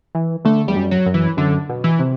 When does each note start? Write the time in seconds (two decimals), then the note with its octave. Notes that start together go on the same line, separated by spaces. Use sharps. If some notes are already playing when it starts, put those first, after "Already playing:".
0.15 E3
0.45 D3 A3
0.67 E2 G3
0.76 F#2
0.91 F#3
1.06 F#2
1.14 E3
1.37 F#2 D3
1.69 B2
1.84 E3
1.99 C3